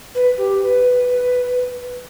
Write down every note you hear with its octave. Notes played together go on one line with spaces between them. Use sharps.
B4
G4
B4